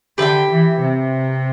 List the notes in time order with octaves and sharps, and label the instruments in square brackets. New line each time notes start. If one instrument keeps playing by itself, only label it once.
[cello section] D3 [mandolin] G4 B4 E5 G5
[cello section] E3
C3